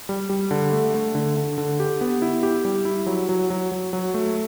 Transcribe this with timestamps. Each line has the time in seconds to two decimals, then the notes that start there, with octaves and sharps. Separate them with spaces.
0.09 G3
0.30 G3
0.51 D3
0.72 A3
0.94 A3
1.15 D3
1.37 D3
1.58 D3
1.80 G4
2.01 B3
2.22 E4
2.43 G4
2.65 G3
2.85 E4
3.06 F#3
3.29 F#3
3.50 F#3
3.72 F#3
3.93 F#3
4.14 A3